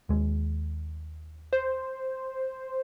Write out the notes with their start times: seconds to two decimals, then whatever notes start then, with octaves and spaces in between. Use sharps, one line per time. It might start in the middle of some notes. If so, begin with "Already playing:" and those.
0.09 D#2 G#3
1.53 C5